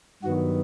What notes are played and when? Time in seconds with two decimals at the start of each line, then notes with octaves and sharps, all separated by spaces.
0.23 G2 D#3 F#3 B3 F#4